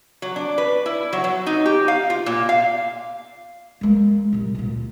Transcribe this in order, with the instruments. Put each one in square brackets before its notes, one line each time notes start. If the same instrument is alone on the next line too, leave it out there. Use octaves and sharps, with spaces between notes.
[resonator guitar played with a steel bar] F#3
D4
B4
E4
F#3
F#3
D#4
G4
F5
F4
A#2
F5
[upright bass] G#3 A#3
C2 A#2
D2 A#2